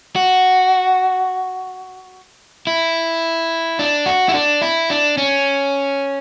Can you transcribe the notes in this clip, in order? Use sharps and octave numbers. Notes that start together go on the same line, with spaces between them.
F#4
E4
D4
F#4
E4
D4
E4
D4
C#4